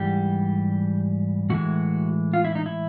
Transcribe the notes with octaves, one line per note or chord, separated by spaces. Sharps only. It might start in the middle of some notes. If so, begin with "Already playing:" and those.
Already playing: G#2 E3 G3 G4
A2 E3 G#3 F#4
F4
E4
D#4
E4